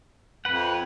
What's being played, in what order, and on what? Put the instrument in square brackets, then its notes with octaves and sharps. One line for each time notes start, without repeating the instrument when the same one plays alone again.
[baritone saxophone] F2 [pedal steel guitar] B4 F#5